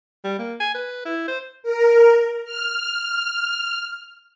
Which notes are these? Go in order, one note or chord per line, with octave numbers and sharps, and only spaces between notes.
G3
A#3
G#5
B4
E4
C5
A#4
F6